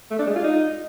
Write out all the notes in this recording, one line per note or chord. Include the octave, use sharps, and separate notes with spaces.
A3
D4
G#3
F4
D#4